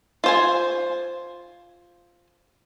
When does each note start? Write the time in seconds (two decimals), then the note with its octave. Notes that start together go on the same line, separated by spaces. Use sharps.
0.24 F4 C5 G#5